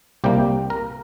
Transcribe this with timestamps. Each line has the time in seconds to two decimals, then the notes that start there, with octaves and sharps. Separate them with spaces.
0.24 C2 C3 G3 A#3 G4
0.70 A#4